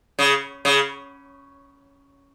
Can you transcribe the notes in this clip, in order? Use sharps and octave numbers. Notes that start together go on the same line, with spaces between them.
C#3
C#3